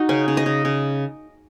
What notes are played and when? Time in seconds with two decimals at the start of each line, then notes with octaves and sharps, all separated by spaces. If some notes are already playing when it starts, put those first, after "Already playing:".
Already playing: D#4 F#4
0.09 C#3 C#4
0.28 C#3
0.37 D#5
0.46 C#3
0.65 C#3